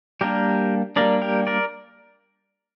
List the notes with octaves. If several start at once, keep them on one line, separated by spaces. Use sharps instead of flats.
G3 A#3 D4 G4 A#4
G3 A#3 D4 A#4 D5
G4 A#4
A#4 D5